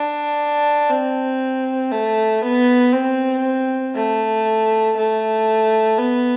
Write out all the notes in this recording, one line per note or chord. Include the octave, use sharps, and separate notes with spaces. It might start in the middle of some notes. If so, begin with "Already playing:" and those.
Already playing: D4
C4
A3
B3
C4
A3
A3
B3